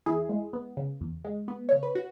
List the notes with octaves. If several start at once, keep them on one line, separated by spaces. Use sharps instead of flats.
E2 E4 G#4
G#3
B3
C#3
E2
G#3
B3
C#3 C#5
B4
F#4